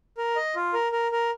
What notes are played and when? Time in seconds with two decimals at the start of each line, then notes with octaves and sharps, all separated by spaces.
0.18 A#4
0.36 D#5
0.56 F4
0.73 A#4
0.92 A#4
1.12 A#4